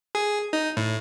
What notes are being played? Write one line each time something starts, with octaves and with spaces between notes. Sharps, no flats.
G#4
D#4
A2